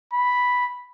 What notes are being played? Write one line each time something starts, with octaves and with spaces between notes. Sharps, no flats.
B5